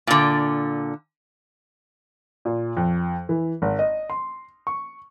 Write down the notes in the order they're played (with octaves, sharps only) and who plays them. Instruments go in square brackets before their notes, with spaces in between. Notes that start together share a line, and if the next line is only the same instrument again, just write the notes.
[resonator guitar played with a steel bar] A#2 D3
[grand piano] A#2
F2
E3
G#1
D#5
C6
C#6